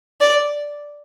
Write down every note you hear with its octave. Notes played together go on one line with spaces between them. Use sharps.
D5